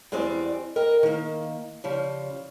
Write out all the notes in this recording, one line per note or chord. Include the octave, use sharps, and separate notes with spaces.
E2 G3 G#3 C4 D5
A#4 D#5 G5
D#3 A#3
C#3 F3 G3